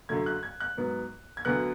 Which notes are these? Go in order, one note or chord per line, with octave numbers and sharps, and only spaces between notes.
F#2 D3 F#3 A3 G#6
F#6
G#6
F#6
G#2 F#3 B3
G#6
D2 D3 F#3 B3 F#6